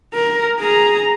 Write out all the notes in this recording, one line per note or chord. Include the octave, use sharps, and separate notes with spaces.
A#4
G#4 A#5